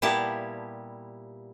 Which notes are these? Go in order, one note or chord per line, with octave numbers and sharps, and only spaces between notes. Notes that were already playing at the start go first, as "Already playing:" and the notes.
A#2 G3 B3 E4 G4 A5